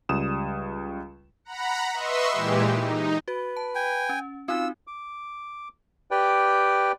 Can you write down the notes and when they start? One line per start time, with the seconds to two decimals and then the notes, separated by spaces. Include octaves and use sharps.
0.09 C#2 G3 D#6 E7
1.45 F#5 A#5 B5
1.93 B4 D#5 E5 C6 C#6 E6
2.31 A#2 E3 G#3 G4
2.71 D#4
3.28 F#4 B4
3.57 A5
3.75 G5 G#5
4.09 C#4
4.48 C4 D#4 F4 F#4 E6
4.87 D6
6.11 G4 B4 D5 G5